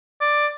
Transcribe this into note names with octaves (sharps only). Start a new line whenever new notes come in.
D5